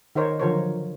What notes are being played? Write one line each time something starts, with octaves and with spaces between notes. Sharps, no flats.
D#3 D#4 A#4 C5 C#5
D3 F3 F#3 A#4 C5 C#5